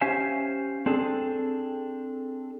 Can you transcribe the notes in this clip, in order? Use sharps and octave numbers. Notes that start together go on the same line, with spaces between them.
C#4 G4 C5 E5 F5 G#5
C4 D4 G#4 A4